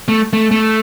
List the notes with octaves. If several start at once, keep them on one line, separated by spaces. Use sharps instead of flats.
A3
A3
A3